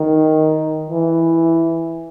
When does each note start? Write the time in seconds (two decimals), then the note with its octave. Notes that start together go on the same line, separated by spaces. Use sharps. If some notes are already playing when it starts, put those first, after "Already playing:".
Already playing: D#3
0.90 E3